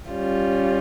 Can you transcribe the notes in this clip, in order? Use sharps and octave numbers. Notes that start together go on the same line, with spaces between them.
G3 C#4 F4